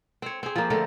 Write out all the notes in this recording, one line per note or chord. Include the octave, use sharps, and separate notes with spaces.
C4 C#5
C4 G#4
F3 A#3
D3 A3 A#4